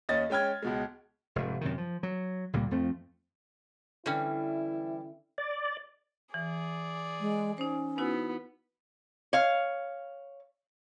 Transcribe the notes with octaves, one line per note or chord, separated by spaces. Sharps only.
D#2 C#4 D#5 A6
G#3 C#4 G5 F6 G#6
C#2 B2 G#3
F1 G#2
F#2 C3 D#3
F3
F#3
C#2 A#2 G3 A#3
F2 F3 A3 C4
D3 E3 G3 C#4 E4
D5
E3 G#4 D5
G#3
C#4 D#4 C5
B3 D#4 E4 F#4
C#5 F5